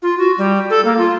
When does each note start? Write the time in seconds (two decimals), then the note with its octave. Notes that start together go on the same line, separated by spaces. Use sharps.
0.02 F4
0.18 F#4
0.38 G3
0.70 A4
0.85 A#3
0.98 F4